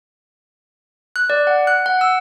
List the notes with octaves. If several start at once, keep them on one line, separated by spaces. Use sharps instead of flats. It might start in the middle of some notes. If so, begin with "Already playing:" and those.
F#6
D5
F#5
F#6
F#5
E6